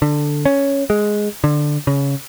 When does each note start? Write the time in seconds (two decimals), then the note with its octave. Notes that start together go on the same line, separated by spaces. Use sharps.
0.02 D3
0.46 C#4
0.90 G#3
1.44 D3
1.87 C#3